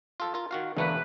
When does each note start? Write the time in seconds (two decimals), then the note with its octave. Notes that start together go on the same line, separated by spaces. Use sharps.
0.20 F4 A4
0.34 F4 A#4
0.51 D#3 F#4 F5
0.77 E1 D3 A3 A#3 B4